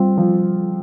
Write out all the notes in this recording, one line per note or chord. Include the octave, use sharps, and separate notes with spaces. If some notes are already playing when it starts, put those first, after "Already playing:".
Already playing: G3 C4 F4
F3